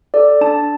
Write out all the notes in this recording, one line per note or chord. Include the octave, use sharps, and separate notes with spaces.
A4 D5
D4 A5